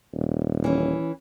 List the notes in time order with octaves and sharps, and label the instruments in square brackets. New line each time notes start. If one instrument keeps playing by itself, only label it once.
[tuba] D#1
[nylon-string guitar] E3 C#4